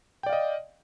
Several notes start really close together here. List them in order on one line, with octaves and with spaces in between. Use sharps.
G5 D5 F5 D#5